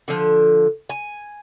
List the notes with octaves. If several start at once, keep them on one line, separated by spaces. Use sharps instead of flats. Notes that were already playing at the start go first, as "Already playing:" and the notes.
D3 F3
G#5